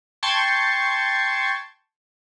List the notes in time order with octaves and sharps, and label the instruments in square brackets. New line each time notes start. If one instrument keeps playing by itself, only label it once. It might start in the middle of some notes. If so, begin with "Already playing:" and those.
[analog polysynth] G5 A5 C6 C#6 G#6